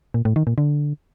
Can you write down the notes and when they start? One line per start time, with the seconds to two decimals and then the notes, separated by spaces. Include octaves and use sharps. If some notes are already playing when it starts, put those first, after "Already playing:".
0.14 A#2
0.25 A2
0.36 D#3
0.47 A#2
0.58 D3